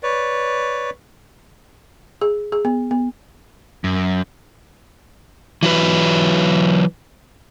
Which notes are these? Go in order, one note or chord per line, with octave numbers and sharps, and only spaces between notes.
B4 C#5 D5
G#4
G#4
B3
B3
F#2
E3 F#3 B4